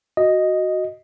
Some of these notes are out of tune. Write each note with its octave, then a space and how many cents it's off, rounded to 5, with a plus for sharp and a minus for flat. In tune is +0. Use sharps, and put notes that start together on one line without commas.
F#4 +0 D#5 +0